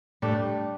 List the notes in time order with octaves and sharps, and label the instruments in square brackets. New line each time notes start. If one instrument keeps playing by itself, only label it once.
[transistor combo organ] A2 [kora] G3 D4 G4